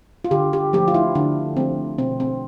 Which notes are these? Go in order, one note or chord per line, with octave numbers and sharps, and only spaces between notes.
F4
D3 G4
G4
F3 A3 G4
F4
E4
D3 D4
F3 A3 C4
B2 C4
C4